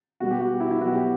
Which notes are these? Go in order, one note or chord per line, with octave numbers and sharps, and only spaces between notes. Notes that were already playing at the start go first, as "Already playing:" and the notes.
B2 G3 B3 F#4
G4
F#4
E4
E4
B2 F#3 B3 F#4
G4